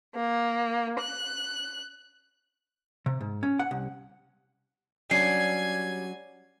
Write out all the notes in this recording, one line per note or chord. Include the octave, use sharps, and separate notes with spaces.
A#3
F#6
C3
G#2
C#4
F#5
C2
F#3 G3 C#4 D4 G#5 G#6 C7